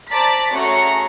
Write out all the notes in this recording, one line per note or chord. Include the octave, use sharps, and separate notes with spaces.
C5 D5 A5 A#5 A6 B6
A3 C#4 F#4 G#4 A#5 C#7